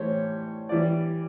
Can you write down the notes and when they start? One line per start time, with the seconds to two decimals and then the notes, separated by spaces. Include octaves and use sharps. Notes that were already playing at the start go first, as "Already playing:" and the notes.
Already playing: A2 E3 G3 C5 C#5
0.69 E3 G3 D5